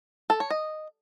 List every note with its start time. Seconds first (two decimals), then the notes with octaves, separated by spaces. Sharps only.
0.30 A4
0.40 C#5
0.50 D#5